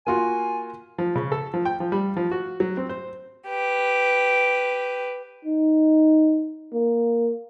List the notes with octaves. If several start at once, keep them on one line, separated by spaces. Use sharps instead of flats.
A#3 F4 F#4 G#5
F3
C#3
A4
F3
G5
F3
G3
F3
F#4
F#3
C4
C5
G4 B4
D#4
A#3